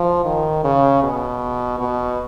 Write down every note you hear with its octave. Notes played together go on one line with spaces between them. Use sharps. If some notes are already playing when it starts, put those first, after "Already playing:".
Already playing: F3
D#3
C#3
B2
B2